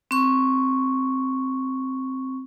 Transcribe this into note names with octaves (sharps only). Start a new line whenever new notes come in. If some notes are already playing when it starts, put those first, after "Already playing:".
C4 C#6